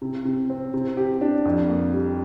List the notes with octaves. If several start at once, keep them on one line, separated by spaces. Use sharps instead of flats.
C3
C3
C4
C3
G4
D4
F2
A#3
G3